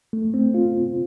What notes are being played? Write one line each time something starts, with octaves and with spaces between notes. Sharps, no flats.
A3
C4
F4